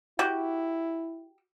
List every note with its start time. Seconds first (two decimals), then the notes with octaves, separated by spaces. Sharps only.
0.19 E4 F#4 G4